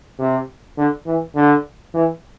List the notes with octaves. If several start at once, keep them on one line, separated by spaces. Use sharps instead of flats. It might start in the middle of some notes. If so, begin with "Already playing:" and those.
C3
D3
E3
D3
E3